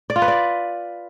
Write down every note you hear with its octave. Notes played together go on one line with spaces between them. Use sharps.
D5
F4
B4
D5